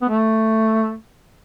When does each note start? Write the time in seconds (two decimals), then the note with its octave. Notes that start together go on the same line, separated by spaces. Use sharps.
0.02 B3
0.09 A3